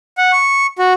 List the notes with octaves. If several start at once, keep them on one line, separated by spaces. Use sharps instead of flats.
F#5
C#6
F#4